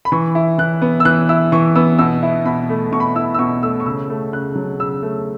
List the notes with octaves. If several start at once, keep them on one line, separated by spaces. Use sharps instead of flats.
B5
E3 C#6
E4
E3 F#6
B3
E6
E3 F#6
E4 E6
E3 C#6
B3 E6
B2 E6
E4
B2 B5
A3
B2 C#6
B5
C#6
E4 E6
E6
B2 C#6
A3 E6
C#6
C#3 E6
A3
C#3 F#6
F#3
C#3 E6
A3